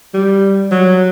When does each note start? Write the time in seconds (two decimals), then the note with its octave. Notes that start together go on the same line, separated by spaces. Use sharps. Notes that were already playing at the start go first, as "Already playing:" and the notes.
0.14 G3
0.71 F#3